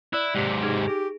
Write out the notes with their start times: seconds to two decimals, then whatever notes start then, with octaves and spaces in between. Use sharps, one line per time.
0.13 E4 D5 E6 F#6
0.35 G#2 C3 G4
0.63 D#4 G#4
0.88 G4 G#4